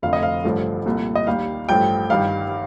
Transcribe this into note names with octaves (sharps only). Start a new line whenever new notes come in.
F1 F2 D3 F3 A3 F5
D#5
F5
A1 G2 D3 F3 A3
C2 A#2 A3
D#5
D#2 D#3 G3 F5
A1 G2 F3 A3 G5
G1 G2 D#3 G3 F5